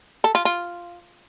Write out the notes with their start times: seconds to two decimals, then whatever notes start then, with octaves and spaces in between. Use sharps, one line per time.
0.24 A4
0.35 F4
0.45 F4